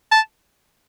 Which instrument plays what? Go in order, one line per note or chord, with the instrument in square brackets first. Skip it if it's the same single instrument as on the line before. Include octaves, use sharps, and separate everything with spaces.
[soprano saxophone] A5